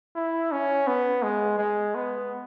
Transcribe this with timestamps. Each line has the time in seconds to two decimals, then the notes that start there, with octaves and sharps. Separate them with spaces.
0.16 E4
0.52 C#4
0.87 B3
1.23 G#3
1.58 G#3
1.95 B3